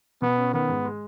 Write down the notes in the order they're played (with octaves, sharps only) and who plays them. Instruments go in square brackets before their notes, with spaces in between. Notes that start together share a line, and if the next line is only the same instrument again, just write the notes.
[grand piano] B2 [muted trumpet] B3
[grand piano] C#4
[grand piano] D#3 [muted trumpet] B3
[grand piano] G#2
G#3